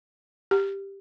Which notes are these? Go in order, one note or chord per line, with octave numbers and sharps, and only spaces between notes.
G4